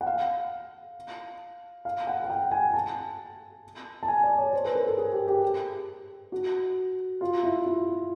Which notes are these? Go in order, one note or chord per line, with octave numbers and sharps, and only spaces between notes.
F#5
F5
F5
F#5
F#5
G5
G#5
A5
A5
G#5
D5
C#5
C5
B4
A#4
A4
G#4
G4
G4
F#4
F4
E4
F4